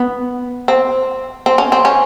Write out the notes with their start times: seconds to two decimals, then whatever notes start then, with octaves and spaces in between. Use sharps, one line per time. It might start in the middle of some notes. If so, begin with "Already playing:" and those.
Already playing: B3
0.68 C4
1.46 C4
1.58 C#4
1.72 C4
1.85 C#4